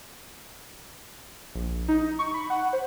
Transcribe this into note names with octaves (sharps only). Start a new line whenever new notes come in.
A#1
A#1
D#4
D#4
C#6
B5
F#5
C5